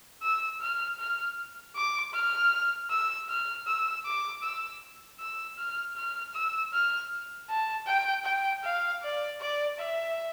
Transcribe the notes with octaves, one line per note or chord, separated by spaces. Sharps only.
E6
F6
F6
D6
F6
E6
F6
E6
D6
E6
E6
F6
F6
E6
F6
A5
G5
G5
F5
D5
D5
E5